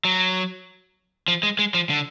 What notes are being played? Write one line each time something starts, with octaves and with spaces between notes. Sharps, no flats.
F#3
F3
G#3
G#3
F3
D3